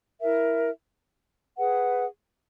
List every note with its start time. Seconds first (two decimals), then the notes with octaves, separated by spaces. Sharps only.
0.21 E4 A#4 E5
1.57 G#4 B4 F#5